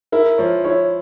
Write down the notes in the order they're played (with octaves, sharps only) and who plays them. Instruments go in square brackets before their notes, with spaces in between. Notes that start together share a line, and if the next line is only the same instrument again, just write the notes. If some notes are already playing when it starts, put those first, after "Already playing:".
[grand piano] E4 [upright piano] A#4
[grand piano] F3 [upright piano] C#5
[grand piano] E4 [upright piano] C#5